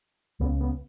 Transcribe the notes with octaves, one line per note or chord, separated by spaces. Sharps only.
C#2 C#3 B3
B3